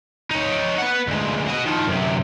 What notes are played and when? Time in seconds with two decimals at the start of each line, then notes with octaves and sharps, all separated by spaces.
0.31 D#4 C#5
0.78 B4 F#5
1.07 D2 G#3
1.48 F#4 D#5
1.66 D#3 F3
1.87 F#2 C3